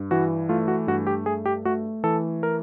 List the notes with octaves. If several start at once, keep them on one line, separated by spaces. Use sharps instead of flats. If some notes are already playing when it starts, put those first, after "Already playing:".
Already playing: G2
E3 F#4
A3 F4
F#4
G2 F#4
G4
A3 G#4
G4
A3 F#4
E3 A4
A#4